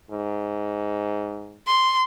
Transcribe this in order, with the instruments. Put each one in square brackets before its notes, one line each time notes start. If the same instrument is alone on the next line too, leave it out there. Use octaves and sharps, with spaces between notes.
[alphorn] G#2
[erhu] C6